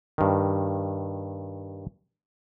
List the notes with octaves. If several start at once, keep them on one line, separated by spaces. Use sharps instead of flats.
G2 D#3